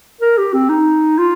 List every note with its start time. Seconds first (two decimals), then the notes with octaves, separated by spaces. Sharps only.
0.21 A#4
0.38 G4
0.54 C4
0.69 D#4
1.18 F4